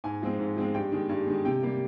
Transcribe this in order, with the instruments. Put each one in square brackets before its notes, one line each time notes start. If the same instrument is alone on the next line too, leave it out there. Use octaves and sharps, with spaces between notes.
[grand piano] G#2 G#5
F3 G#3 C4
G#2
F3 G#3 C4
G2 G5
D#3 G#3
G2
D#3 G#3
C3 G5
G3 A#3